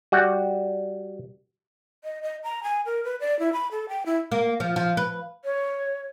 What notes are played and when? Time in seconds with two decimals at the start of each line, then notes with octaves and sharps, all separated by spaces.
0.12 G3 F#4 F#5
2.04 D#5
2.23 D#5
2.44 A#5
2.63 G#5
2.86 A#4
3.04 B4
3.20 D5
3.39 E4
3.53 B5
3.71 A4
3.89 G5
4.06 E4
4.32 A#3
4.60 F3
4.76 F3
4.97 B4
5.45 C#5